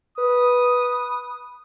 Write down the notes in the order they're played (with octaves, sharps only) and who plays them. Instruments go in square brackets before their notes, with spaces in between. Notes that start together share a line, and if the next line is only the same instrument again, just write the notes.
[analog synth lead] B4 [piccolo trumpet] D#6